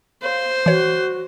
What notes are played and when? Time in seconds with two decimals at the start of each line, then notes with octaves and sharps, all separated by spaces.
0.23 C5 F5
0.66 E3 F#4 C#5